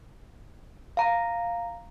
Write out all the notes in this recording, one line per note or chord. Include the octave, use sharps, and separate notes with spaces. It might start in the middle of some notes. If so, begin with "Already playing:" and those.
F5 A#5